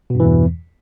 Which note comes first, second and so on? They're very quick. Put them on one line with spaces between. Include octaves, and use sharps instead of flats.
B2 G2 E3 E2